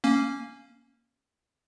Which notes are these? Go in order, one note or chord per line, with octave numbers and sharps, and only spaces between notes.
A#3 C#4